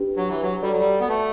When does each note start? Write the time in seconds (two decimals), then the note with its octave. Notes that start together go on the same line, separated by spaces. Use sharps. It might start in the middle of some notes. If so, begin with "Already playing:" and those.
Already playing: D4 G4 B4
0.16 F#3
0.29 E3
0.42 F#3
0.62 G3 F#4 A4 D5
0.72 F#3
0.80 G3
1.00 B3
1.09 A3